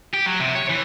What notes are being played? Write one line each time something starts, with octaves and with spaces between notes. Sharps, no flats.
G4
F#3
C3
C#5
E3